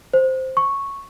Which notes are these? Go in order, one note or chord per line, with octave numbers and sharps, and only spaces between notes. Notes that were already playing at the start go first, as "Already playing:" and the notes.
C5
C#6